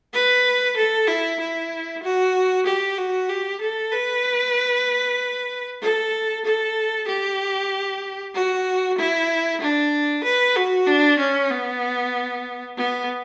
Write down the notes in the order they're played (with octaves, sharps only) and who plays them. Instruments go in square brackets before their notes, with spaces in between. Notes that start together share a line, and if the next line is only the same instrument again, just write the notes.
[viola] B4
A4
E4
E4
F#4
G4
F#4
G4
A4
B4
A4
A4
G4
F#4
E4
D4
B4
F#4
D4
C#4
B3
B3